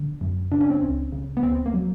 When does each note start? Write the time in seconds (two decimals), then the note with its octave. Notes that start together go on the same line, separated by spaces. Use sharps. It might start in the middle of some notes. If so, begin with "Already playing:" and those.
Already playing: D3
0.21 F#2
0.52 C#3 D4
0.61 C#4
0.70 C4
0.81 C#2 C#4
1.12 C#3
1.37 B3
1.43 D2 C4
1.66 A#3
1.74 F#3